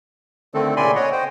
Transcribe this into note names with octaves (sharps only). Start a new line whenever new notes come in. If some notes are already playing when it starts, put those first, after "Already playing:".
D3 D#3 A3 C4 A4
A#2 C#3 D5 G#5 B5 C6
C#5 D#5 F#5
C5 G5